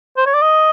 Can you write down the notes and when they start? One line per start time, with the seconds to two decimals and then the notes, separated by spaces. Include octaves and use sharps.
0.17 C5
0.26 C#5
0.34 D5
0.42 D#5